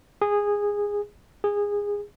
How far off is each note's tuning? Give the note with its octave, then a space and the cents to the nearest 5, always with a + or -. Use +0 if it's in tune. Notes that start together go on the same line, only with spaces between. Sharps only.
G#4 -15
G#4 -20